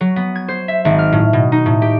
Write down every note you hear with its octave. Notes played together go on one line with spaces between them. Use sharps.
F#3
B3
G#6
C5
E5
G#1
F6
A2
B2
D#4
A2
G4